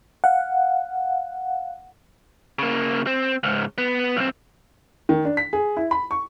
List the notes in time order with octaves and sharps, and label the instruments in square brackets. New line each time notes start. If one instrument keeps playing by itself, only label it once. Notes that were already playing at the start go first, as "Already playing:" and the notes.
[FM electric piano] F5 F#5
[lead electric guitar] C#3 A#3
C4
C#2 G#2
B3
B1 C4
[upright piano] D#3
D4
B6
G#4
E4
B5
C#6